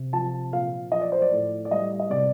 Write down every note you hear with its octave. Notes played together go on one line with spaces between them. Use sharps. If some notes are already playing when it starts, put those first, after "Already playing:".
Already playing: C3
F3 A5
A#2 F5
F3 D#5
D5
C5
D5
A2
D5
G3 D#5
D#5
C3 D5